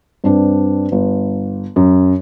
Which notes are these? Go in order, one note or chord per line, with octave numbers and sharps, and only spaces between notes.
G2 C4 D4
G1
F#2